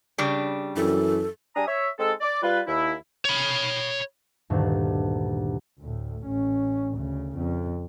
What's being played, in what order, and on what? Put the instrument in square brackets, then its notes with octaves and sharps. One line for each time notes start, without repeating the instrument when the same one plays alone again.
[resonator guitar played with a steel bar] C#3 G3 D4
[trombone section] F#2 [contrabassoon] E3 [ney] A4
[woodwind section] G3 D4 G#5 A#5 D#6
C#5 E5
G#3 C4 D#4 A4
D5
G3 F4 B4
D#2 E4
[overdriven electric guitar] C#5 B5
[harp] D2 G2 A#2 D#3 D4
[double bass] D2 A2
A1 C#4
D2 C#3
F2